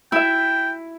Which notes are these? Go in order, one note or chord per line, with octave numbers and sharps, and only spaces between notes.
E4 E5 G5